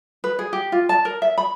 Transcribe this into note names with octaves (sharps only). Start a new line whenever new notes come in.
B4
G#4
G4
F4
A5
A#4
E5
B5